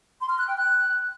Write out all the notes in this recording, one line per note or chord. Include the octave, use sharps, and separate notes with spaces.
C6
F6
F#6
G5
F#6